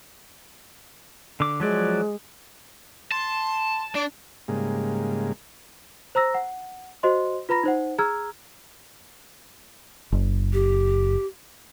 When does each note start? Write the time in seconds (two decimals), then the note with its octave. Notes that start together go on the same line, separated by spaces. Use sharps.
1.40 D3 D6
1.60 F3 F#3 G#3 D5
3.12 A5 C6
3.95 D4 D5
4.48 G#2 C#3 G3 G#3 A#3
6.15 C5 A#5 E6 A#6
6.34 F#5
7.03 F#4 C5 D#5 C6
7.49 F4 B4 A#5 B5 A#6
7.63 D#4 C5 F#5
7.98 G#4 A#5 E6 F6 G#6
10.12 F#1
10.53 G4